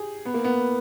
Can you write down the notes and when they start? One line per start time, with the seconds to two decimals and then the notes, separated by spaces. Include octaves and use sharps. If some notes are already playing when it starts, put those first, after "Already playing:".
Already playing: G4 G#4
0.25 B3
0.34 A#3
0.44 B3